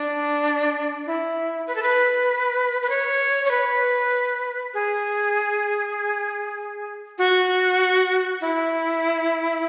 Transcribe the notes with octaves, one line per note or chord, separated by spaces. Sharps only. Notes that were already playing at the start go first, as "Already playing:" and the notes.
Already playing: D4
E4
B4
A4
B4
B4
C#5
C#5
B4
G#4
F#4
E4